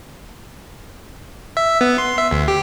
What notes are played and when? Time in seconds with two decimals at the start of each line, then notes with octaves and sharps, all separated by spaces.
1.57 E5
1.81 B3
1.98 C6
2.18 E5
2.31 D2
2.48 G4